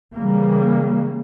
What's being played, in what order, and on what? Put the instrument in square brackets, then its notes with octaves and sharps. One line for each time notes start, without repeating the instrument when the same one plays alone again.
[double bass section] C#3 E3 G3 A#3